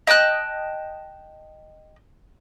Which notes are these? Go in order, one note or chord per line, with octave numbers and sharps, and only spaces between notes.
D#5 G5 A5 F#6